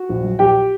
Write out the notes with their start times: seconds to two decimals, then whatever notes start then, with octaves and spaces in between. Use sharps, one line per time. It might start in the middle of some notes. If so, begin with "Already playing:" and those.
Already playing: F#4
0.09 A#1
0.24 F#3
0.39 A#1 G4 G5